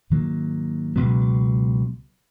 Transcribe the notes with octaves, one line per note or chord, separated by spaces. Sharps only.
G#2 D#3 F#3 A#3
C#2 B2 F#3 B3